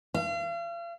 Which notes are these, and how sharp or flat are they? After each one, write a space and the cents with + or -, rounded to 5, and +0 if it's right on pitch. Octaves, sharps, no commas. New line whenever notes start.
F5 -40